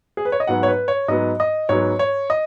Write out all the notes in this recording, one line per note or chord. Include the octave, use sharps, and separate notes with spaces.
G#4
B4
C#5
D#5
G#2 F#3 B3 F#5
C#5
B4
C#5
G#2 F#3 B3 D#5
D#5
G#2 F#3 B3 C#5
C#5
D#5